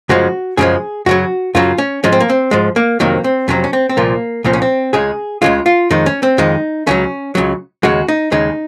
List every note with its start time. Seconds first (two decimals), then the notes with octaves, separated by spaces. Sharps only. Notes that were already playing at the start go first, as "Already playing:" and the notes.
0.09 F#2 C#3 F3 G#3 F#4
0.57 F#2 C#3 F3 G#3 G#4
1.06 F#2 C#3 F#3 F#4
1.55 F#2 C#3 F#3 F4
1.78 C#4
2.04 G#2 F3 G#3 C#4
2.12 C4
2.20 A#3
2.30 C4
2.51 G#2 F3 G#3
2.76 A#3
3.00 F2 C3 D#3 F#3 A#3
3.24 C4
3.48 F2 C3 D#3 F#3 C#4
3.64 C#4
3.73 C4
3.89 C4
3.97 C2 A#2 F3 A#3
4.44 C2 A#2 F3 C4
4.53 C#4
4.62 C4
4.93 C#2 C#3 G#3 G#4
5.42 C#2 C#3 G#3 F4
5.66 F4
5.90 F2 D#3 G#3 D#4
6.06 C#4
6.23 C4
6.38 F2 D#3 G#3 D#4
6.87 C#2 C#3 F#3 C#4
7.35 C#2 C#3 F#3
7.83 D#2 C#3 G#3 F#4
8.08 D#4
8.32 D#2 C#3 G#3 D#4